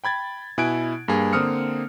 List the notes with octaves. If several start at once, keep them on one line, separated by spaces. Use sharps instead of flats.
G5 B5 G#6 A6
B2 E4 G#5 F#6 G#6 D7
G2 A#3 G#4
D3 A#3 C4 D#6 F6 C#7